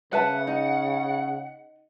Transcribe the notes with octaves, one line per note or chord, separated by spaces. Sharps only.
C#3 B4 E5 F#5 A5
D#4